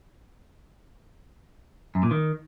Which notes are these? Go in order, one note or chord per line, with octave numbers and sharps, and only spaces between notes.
F#2
A#2
D#3